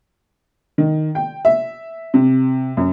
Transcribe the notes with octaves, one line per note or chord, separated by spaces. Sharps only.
D#3
G5
E5
C3
F#2